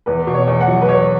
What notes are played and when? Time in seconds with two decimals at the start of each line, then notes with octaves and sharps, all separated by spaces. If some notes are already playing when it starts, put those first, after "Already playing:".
0.06 E2 B4
0.27 B2
0.34 C#5
0.47 E2
0.60 F#5
0.68 F#3
0.81 B4
0.88 E2 C#5